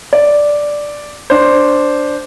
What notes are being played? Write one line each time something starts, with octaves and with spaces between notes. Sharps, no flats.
D5
D4 C5